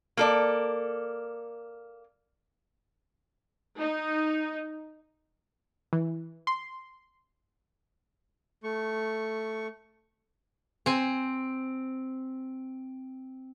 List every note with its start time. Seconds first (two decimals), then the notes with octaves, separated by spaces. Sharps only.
0.17 A#3 A4 D5
3.79 D#4
5.93 E3
6.47 C6
8.64 A3 C#6
10.86 C4 G#5